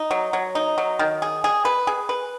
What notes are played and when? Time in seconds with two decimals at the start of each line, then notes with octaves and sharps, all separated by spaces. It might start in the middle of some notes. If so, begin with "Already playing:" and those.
Already playing: D#4
0.11 F#3
0.33 F#3
0.55 D#4
0.78 F#3
0.99 D#3
1.22 G#4
1.44 G#4
1.65 B4
1.87 G#4
2.09 B4